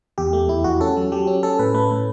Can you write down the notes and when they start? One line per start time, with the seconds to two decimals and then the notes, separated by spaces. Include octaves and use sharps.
0.18 E2 G4
0.33 A3
0.48 E2 E4
0.64 E2 F#4
0.81 C#4 A4
0.97 F#3
1.12 F#3 G4
1.27 C#4
1.43 C#4 A4
1.59 A2 B4
1.74 A3 B4
1.91 A2